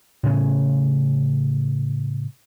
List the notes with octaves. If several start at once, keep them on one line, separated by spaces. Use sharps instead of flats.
A2 C#3 C#4